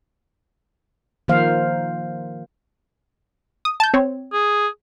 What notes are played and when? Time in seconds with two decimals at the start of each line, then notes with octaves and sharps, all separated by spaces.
1.28 D#3 F3 A#3 C5 F5
3.65 D#6
3.80 A5 G6
3.94 C4 C#5
4.33 G#4